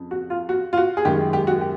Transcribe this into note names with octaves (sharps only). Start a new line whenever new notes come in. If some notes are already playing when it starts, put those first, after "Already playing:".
Already playing: F2 C#3
F#4
F4
F#4
F4
F#4
G#4
F#2 D#3 G#3 G4
G4
F#4
G4